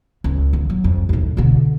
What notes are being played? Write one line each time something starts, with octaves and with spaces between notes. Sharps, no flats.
C#2
D3
F#3
F2
D#2 A2
B2 D3